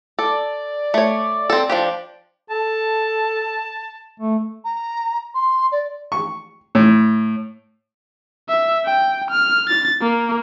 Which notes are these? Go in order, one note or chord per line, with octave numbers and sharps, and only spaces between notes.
A4 D5
A3 C#5
C4 A4
F3 D4 G4
A4 A5
A3
A#5
C6
D5
C#6
A2
E5
G5
F6
A6
A#3